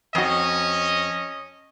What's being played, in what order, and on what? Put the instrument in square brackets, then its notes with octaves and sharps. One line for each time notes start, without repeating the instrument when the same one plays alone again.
[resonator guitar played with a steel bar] F2 F#4 [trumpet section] C#4 D#5